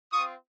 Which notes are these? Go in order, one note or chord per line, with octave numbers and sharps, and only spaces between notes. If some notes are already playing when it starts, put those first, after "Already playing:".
C4 F4 C#6 D#6